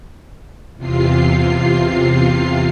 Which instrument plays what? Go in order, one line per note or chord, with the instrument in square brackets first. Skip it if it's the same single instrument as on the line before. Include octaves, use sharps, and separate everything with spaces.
[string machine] E2 C3 F4 C7